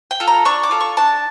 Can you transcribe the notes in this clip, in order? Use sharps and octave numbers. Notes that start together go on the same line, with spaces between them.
G5
F4 A4
A#5
D4 C#6
D6
F4 A4
C#6
D4 A5